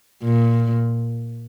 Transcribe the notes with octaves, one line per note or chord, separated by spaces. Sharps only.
A#2